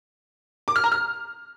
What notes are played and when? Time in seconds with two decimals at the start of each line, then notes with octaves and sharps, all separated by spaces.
0.68 D6
0.76 F6
0.84 A#5
0.92 F6